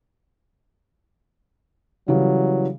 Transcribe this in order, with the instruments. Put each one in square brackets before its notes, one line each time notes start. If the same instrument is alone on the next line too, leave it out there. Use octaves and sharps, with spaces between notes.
[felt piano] C#3 E3 G3 [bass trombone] F#3